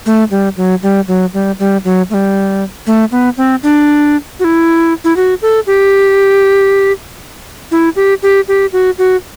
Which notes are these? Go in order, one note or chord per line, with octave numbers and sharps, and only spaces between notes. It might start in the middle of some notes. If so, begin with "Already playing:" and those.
A3
G3
F#3
G3
F#3
G3
G3
F#3
A3
G3
A3
B3
C4
D4
F#4
E4
E4
F#4
A4
G4
E4
G4
G4
G4
F#4
F#4